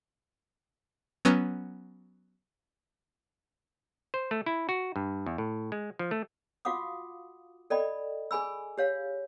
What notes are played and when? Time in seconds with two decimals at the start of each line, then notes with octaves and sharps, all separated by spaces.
1.25 F#3 B3 C#4 A#5 F6
4.14 C5
4.31 A3
4.46 E4
4.69 F#4
4.96 G2
5.26 E2
5.38 A2
5.72 G#3
5.99 F3
6.11 A3
6.65 F4 F#4 F5 F#5 D6 D#6
7.70 A4 D5 D#5 G5 B5
8.31 G#4 G#5 B5 E6
8.78 G4 C#5 F5